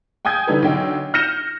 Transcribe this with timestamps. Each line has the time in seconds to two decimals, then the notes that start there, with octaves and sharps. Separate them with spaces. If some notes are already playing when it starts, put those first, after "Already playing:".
0.25 G5 G#5 D#6 G6 G#6
0.47 D3 E3 G3 D#4 A4 B4
0.62 B1 D3 G5
1.14 F6 G6 A#6 C#7 E7